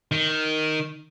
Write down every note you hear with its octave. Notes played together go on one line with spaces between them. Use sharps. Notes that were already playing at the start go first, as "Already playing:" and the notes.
D#3